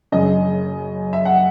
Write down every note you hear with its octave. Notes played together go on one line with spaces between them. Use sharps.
F#1 F#2 C#3 D#5
E5
F#5